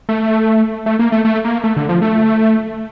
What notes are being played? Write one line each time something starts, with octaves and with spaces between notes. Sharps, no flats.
A3
A3
A#3
A3
A3
A#3
A3
D3
F3
A3